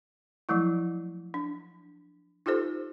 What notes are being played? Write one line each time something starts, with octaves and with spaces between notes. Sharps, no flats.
F3 F#3 A3 E4
D4
D#4 F4 G4 A4 C5